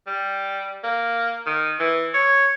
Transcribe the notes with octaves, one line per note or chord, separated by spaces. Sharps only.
G3
A#3
D#3
E3
C#5